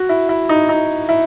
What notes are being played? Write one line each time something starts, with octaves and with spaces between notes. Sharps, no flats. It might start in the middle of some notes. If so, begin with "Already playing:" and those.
Already playing: F#4
E4
E4
D#4
D#4
E4